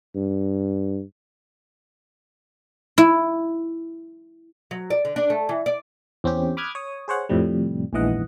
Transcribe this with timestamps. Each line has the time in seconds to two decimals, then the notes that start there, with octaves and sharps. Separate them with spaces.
0.16 G2
2.98 E4
4.71 F#3
4.90 D5
5.05 D3
5.16 D4
5.30 A3
5.49 E3
5.66 D5
6.24 E2 C4 C#4 G4
6.57 B5 D6 D#6 F6 F#6 G#6
6.75 C#5 D#6
7.08 G#4 C5 C#5 F#5
7.29 F2 A2 C3 G3
7.93 A#1 E2 G#2 E3 D#5 F#5